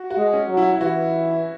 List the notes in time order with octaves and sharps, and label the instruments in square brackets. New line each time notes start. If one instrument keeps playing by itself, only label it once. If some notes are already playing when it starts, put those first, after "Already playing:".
Already playing: [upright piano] F#4
F#4
[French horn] G#3
[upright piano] C#4
[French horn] F#3
[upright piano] E4
E4
[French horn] E3 [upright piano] F#4